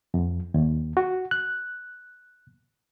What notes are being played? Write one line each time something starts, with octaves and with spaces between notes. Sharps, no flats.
F2
D#2
F#4
F#6